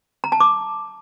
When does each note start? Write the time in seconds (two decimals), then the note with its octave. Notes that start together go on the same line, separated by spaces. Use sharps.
0.24 A#5
0.32 A5
0.40 D6